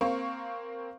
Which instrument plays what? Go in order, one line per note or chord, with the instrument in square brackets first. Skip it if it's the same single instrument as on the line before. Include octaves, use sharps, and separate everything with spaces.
[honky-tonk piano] A#3 C4 F5 C#6